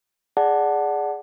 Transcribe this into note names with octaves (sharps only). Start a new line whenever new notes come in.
G#4 D5 F#5 A5